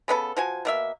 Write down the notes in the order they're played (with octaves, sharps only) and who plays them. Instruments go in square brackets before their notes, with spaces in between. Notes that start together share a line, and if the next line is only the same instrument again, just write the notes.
[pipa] C#3 B3 D4 A4
F3 F#4 G#5
B2 A#3 E5